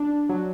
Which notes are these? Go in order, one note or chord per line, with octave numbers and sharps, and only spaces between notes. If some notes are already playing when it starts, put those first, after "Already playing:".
Already playing: D4
F#3